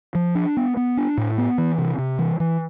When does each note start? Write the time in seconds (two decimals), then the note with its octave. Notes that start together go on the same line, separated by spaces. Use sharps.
0.15 F3
0.35 D4
0.57 B3
0.77 B3
0.97 D4
1.17 A2
1.38 B3
1.58 E3
1.78 C3
1.98 C3
2.19 E3
2.40 E3